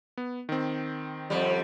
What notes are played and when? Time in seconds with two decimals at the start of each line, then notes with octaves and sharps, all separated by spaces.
0.17 B3
0.49 D#3 C4
1.30 F2 G3